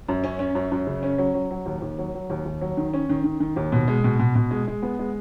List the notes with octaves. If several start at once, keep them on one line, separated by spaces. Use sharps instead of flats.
F#2
C#4
C#4
F#2
F#2
C#3
C#4
F#3
F#3
F#3
D#2
D#2
F#3
F#3
D#2
D#2
F#3
D#3
C#4
D#3
D#3
D#3
D#2
B2
G#3
B2
B2
B2
G#3
G#3
B3
G#3